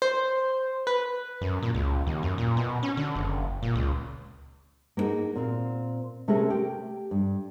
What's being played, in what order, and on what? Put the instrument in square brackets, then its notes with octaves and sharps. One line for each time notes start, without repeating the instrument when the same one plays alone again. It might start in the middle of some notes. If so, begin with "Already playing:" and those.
[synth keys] C5
B4
[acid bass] F#2
A#2
C#2
D#2
F#2
A#2
B2
C#4
D3
F#1
A#2
C#2
[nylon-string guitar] A#3 B3 D#4 F#4 G#4
A#2 C4 F5
C3 A3 C#4 G4 G#4 A#4
G4 G5
G2